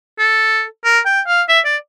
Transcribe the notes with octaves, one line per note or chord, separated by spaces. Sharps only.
A4
A#4
G5
F5
E5
D5